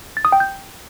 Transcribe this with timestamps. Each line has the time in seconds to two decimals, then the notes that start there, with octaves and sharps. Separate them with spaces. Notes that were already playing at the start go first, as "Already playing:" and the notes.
0.17 A6
0.25 D#6
0.32 G5
0.40 G6